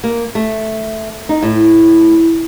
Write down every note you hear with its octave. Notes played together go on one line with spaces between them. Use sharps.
A#3
A3
D#4
A2